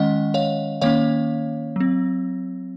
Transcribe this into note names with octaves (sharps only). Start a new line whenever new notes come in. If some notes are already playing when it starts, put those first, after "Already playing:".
Already playing: D#3 G#3 C#4 D#5 F#5
C#5 F5
D#3 A#3 C#4 C#5 F5
F#3 C4